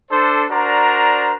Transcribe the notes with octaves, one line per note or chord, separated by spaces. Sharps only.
D4 A4 C5
D4 F#4 A#4 C5 D5 A#5